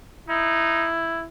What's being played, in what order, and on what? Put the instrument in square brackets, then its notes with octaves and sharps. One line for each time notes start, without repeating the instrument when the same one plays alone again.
[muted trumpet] D#4 [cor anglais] E4